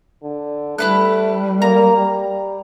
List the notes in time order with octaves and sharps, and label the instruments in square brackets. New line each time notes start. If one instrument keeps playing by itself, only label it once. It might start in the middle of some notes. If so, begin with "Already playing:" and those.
[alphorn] D3
[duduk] G3 [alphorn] A3 [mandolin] E4 B4 F#6
[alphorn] A#3 [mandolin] A#5
[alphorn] G3